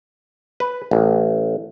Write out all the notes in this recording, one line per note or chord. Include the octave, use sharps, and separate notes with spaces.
B4
A1